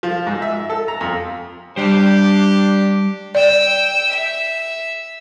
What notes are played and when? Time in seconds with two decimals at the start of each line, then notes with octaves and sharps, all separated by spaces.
0.03 F3
0.27 G#2
0.42 E5
0.70 A4
0.88 A#5
1.01 F2
1.76 G3 D4 G4 C5
3.35 D5 G5 E6
4.10 E5